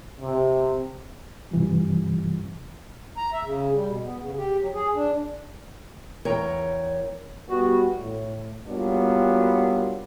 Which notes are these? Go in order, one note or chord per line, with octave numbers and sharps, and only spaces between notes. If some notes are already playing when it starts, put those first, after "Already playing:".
C3
G2 C3 E3 F3 G3
A#5
E5
C#3
G3
B2
B3
C#3
G4
F#3
G#4
D4
E2 A#4 C#5 G5
G3 B3 F#4
A2
F#3 G3 A#3 B3 D4 F4